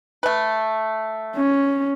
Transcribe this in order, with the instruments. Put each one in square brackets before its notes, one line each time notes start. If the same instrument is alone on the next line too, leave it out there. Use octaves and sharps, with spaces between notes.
[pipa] A3 B4
[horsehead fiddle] C#4